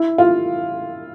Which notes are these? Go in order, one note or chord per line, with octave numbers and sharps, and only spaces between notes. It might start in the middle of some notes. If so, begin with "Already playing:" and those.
Already playing: E4
F4